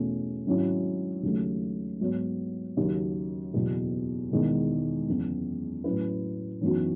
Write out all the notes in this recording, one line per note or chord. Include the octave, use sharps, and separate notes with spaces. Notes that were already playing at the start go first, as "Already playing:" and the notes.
Already playing: E2 B2 A3 C#4
G#1 G#2 F#3 C#4 E4
D#2 C#3 F#3 A3
G#2 F#3 B3 F#4 C#5
D#2 C#3 F#3 C#4
F#1 E2 B2
E1 E2 D#3 G#3
F#1 E2 C#3 E3
A2 F#3 C#4 E4 B4
F#2 E3 B3 D#4 F#4